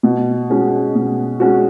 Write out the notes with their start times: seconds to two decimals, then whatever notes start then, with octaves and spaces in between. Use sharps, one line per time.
0.03 B2
0.50 G#3 C#4 F#4
0.95 B2
1.40 G#3 C#4 F#4